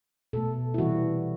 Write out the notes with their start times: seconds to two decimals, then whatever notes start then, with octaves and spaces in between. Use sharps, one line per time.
0.33 B2 A3 A4
0.74 E4
0.78 C3 E3 G3 F#4